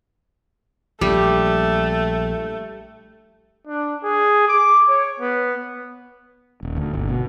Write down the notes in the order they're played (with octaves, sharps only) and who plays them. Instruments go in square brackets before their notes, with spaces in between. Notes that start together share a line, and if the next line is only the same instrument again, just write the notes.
[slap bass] A#1 [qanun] G3 [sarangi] A3
[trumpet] D4
G#4
D6
C#5
B3
[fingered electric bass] D#1
D2
G1
B2